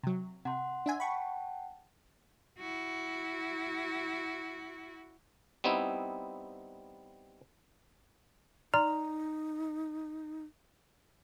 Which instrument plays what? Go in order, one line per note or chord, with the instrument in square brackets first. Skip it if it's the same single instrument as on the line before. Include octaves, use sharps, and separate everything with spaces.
[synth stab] C3 F#3
[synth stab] C3 [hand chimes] F#5 C6
[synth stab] D4 E5 G#5
[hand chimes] F#5 G5 A5 [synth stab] B5 C#6
[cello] E4 F#4
[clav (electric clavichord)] G3 B3 C4 D#4 E4
[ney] D#4 [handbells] D5 C6 F6 [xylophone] A#5